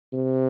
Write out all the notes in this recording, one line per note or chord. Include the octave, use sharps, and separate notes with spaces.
C3